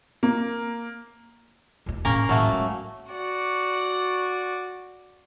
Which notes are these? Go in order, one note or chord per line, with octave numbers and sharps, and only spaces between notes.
A#3
D#2 D#4
A2 A#3 C#4 A#4
A2 F#3 A3 A#3
G#3
F#4 D5